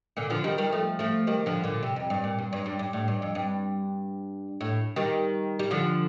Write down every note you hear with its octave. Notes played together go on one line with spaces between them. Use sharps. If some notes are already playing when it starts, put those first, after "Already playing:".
A#2 D3
D3 F3
D#3 G3
D#3 G3
F3 A3
F3 A3
D#3 G3
D3 F3
A#2 D3
C3
F2
G2
A#2
G2
G2
G2
G2
A2
G2
F2
G2
A2
D#3 G3
G3
D3 F3